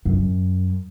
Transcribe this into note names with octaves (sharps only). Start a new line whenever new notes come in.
F#2